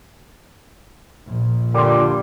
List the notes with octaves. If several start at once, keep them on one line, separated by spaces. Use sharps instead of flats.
A#1
A#2 D3 G3 C6 D6